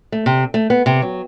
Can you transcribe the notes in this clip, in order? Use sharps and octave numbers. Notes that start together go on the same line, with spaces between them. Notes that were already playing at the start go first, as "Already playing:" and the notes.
A3
C3
A3
B3
C3
F#3